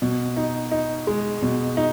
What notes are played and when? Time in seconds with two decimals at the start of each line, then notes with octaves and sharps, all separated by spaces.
0.02 B2
0.37 D#4
0.72 D#4
1.07 G#3
1.42 B2
1.77 D#4